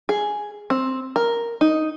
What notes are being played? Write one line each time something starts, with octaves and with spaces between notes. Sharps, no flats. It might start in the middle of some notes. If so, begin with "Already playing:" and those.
G#4
C4
A#4
D#4